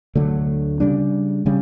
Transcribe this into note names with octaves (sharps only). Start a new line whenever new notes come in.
D2 D3 F#3 A3
C#3 G3 D4
C#3 G3 C#4